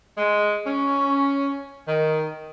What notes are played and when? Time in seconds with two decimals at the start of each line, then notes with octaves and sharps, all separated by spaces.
0.17 G#3
0.66 C#4
1.87 D#3